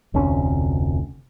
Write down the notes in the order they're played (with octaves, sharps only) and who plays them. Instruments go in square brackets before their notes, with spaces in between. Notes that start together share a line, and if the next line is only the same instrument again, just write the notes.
[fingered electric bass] F1 D2 C3 C#4